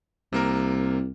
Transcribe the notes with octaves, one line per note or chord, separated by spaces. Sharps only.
C2 C3 A#3 A#4